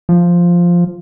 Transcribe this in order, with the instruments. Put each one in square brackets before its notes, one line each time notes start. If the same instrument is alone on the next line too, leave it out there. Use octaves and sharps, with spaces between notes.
[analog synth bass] F3